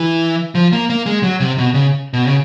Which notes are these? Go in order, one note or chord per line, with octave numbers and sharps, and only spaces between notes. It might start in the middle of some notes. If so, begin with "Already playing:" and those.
Already playing: E3
F3
A#3
A#3
G#3
F#3
C3
B2
C#3
B2
C#3